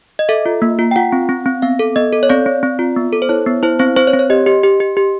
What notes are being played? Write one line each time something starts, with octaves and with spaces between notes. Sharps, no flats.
D#5
A4 E5
F4
A#3
F4
G5
F4 F#5
C4
C4
C4
B3 F5
A4
B3 D#5
A4
C#5
C4 D5
C4
C4
F4
B3
A4
C5
E4 C#5
B3
E4 C5
C4 C5
C4 C5
C#5
C4
C#5
G4 D#5
G4
G4
G4
G4